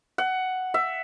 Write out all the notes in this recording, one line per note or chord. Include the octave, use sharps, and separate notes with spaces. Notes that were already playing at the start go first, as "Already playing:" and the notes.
F#5
E5